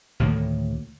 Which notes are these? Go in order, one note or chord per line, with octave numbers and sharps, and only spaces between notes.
D2 A2 D#3 A#3